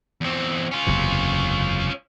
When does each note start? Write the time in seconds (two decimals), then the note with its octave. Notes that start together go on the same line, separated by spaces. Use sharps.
0.21 E2 C4
0.71 C#4 F4
0.87 F#1 E2 C3